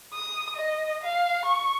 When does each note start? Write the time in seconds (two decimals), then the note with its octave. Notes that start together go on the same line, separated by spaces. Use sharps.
0.14 D#6
0.57 D#5
1.04 F5
1.45 C#6